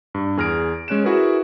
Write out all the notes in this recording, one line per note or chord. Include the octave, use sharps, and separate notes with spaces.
G2
E2 G#4 F6 A#6 D7
G#3 C#4 C#5 F#6 D7 E7
E4 F#4 G#4 A#4 B4